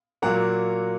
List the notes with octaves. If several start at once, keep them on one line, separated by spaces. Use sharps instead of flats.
A#2 F#3 A#3 F#5 A#5